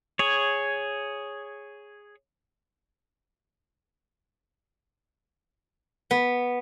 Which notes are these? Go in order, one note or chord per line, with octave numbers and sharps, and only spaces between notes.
G#4 C#5
B3